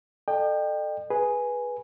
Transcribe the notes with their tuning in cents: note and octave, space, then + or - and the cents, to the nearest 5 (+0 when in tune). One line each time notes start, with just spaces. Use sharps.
A4 +0 D#5 -45 G5 +15
G#4 +0 B4 -10